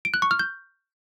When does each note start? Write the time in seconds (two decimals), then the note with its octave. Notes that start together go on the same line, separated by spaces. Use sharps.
0.05 D7
0.14 F#6
0.22 C#6
0.31 F6
0.39 G6